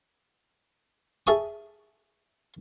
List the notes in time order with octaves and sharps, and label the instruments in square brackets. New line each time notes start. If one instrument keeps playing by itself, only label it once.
[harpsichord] G#4 E5 A5 C#6 D#6